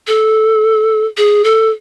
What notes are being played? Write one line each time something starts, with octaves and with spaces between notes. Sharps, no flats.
A4
G#4
A4